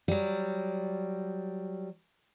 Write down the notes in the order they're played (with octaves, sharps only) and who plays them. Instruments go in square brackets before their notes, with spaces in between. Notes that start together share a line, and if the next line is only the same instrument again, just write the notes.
[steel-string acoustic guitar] F#3 G3